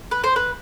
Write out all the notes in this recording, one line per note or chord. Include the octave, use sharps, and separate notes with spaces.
B4
C5
B4